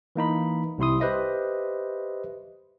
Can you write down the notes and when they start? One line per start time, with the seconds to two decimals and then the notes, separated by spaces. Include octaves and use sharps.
0.16 E3 A#3 D#4 B5
0.78 C2 C3 E4 C6 D#6
1.00 G4 B4 C5 D#5 E5